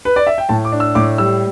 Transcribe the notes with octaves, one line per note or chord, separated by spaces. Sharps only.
B4
D5
E5
G5
A2 A5
D6
D4
E6
A2 D6
G3 E6